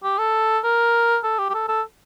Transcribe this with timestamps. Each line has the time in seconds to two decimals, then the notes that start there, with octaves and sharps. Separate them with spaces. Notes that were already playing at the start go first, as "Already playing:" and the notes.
0.04 G4
0.18 A4
0.64 A#4
1.23 A4
1.39 G4
1.50 G4
1.54 A4
1.68 A4